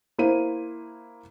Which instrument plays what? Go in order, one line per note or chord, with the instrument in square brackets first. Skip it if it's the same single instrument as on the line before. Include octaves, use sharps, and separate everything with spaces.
[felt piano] A#3 E4 C5 D#7